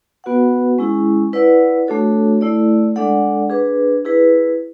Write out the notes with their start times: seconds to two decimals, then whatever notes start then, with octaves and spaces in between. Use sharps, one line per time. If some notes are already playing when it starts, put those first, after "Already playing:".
0.24 B3 F#4 B4 F#5
0.79 G#3 C#4 E4 G#4
1.33 E4 B4 D5 F#5
1.87 A3 D4 F#4 A4 C#5
2.41 A3 E4 A4 D5
2.96 G#3 D4 A4 D5 F#5
3.50 D4 G#4 B4
4.05 E4 G#4 B4